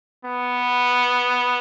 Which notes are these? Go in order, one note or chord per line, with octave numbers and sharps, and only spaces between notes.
B3